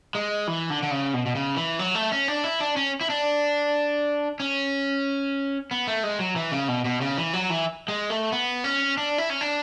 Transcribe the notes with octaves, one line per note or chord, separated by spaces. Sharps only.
G#3
E3
D3
D3
C#3
B2
B2
C#3
E3
F#3
A3
C#4
D4
E4
D4
C#4
E4
D4
C#4
B3
A3
G#3
F#3
E3
C#3
B2
B2
C#3
E3
F#3
E3
G#3
A3
B3
C#4
D4
E4
C#4
D4